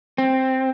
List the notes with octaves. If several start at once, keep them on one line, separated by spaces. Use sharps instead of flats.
C4